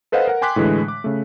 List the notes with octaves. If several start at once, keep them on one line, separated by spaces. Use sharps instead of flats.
A4 B4 C5 D#5 F5 F#5
A#4 F#5
G5 G#5 C6 D6 F#6 B6
A2 D3 E3 G#3
D6
C#3 A3